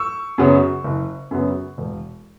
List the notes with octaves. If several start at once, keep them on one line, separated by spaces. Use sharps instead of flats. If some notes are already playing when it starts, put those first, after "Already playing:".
Already playing: C#6 E6
F#2 C#3 F#3 B3
F#1
F#2 C#3 F#3 B3
E1